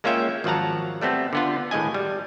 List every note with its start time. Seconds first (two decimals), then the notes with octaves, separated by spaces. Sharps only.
0.04 G#3 A#3 C#4 F4 E5 G5
0.44 G#1 F3 F#3 F#5 A5 A#5
1.01 G3 A3 B3 C4
1.33 D3 B3 F4
1.71 G#1 A2 G#3 D#5 G#5
1.94 G3